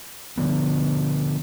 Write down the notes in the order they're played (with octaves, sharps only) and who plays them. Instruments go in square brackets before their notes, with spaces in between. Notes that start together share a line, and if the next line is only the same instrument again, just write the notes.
[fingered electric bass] D3 E3 F3 B3